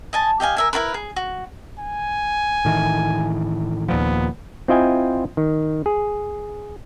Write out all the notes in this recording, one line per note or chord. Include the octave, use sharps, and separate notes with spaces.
D#5 G#5 A5
G4 D#5 F5 G#5
A#4 E5 G#5
E4 F4 A#4 B4
G#4
F#4
G#5
A2 D#3 E3
D#2 A#2 F3 B3
C4 E4 F4 D#5 G5 G#5
D#3
G#4